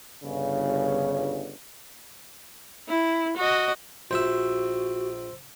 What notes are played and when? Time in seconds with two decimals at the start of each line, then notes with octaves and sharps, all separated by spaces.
0.24 G1 C#3
2.89 E4
3.37 F#4 D#5
4.11 A#1 F#4 C5 E5 E6